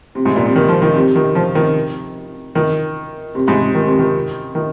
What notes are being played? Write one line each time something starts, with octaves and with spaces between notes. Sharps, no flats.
C3
G#2
A#2
C3
D#3
F3
D#3
C3
D#3
F3
D#3
D#3
C3
G#2
C3
D#3
C3
D#3
D#3